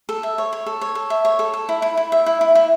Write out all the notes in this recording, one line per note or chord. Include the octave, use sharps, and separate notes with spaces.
A4
E5
C#5
C#5
A4
C#5
A4
E5
C#5
A4
A4
E4
E4
E4
E5
E4
E4
E4